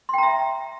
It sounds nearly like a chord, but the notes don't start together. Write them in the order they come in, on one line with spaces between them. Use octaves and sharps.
C6 G5 A#5 E5